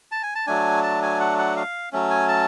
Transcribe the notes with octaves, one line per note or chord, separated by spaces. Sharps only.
A5
G#5
A5
F#3 A3 D4 G#5
A5
G#5
F#5
F#5
F5
F#3 A3 C#4
G#5
A5